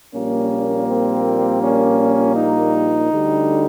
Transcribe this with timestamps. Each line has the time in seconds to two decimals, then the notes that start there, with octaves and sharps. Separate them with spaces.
0.13 A#1 A#2 G3 A#3 C#4
0.88 C4
1.63 C#4
2.36 D#4
3.12 D2 D3 G3